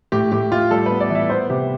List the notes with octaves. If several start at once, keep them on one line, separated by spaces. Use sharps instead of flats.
A2 G4
A2 G4
A2 F4
G3 A4
B4
B3
D5
E3
E5
B3 C5
C3 G4